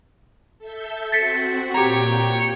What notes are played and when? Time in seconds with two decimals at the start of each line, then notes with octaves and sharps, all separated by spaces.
0.59 A4 E5 G6
1.12 C4 F#4 A6 B6 C#7
1.74 A#2 G4 C#5 G5 A#5